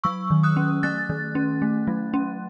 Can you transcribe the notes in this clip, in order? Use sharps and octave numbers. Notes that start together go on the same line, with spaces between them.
F#3 C#6 E6
D#3
D#6 F#6
C#4
A3 F#6 A6
D#3
C#4
A3
F#3
C#4